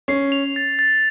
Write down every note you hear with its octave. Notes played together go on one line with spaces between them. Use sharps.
C#4 C7
F7
A6
A6